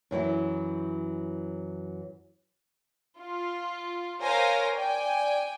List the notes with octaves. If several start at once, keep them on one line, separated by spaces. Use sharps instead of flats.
F#2 E3 F#3 E4
F4
A#4 C5 C#5 F5 G#5 A#6
D5 G5 G#5